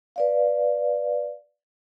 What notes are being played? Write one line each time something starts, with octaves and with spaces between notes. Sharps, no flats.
B4 D5 F5